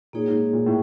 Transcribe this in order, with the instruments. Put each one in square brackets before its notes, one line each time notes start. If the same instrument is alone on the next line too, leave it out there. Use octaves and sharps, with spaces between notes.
[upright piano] A#2 [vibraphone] A#3 D#4 G#4 C#5
[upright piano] G#2
A#2
A2